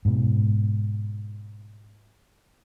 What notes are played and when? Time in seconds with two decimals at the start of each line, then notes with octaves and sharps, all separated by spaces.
0.05 G#2 B2